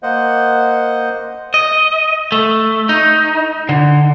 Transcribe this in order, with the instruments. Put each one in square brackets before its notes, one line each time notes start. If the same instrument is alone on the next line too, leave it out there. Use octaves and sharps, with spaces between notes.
[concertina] A#3 C5 D#5 F#5
[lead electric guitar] D#5
A3
D#4
D3